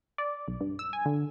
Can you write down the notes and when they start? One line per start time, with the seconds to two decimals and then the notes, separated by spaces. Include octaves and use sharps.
0.18 D5
0.48 B1
0.61 G2
0.79 E6
0.93 G#5
1.06 D3